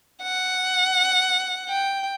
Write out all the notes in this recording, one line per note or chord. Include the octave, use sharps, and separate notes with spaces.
F#5
G5